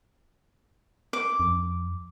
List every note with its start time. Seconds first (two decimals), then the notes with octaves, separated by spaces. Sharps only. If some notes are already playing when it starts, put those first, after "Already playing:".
1.13 D6
1.40 F2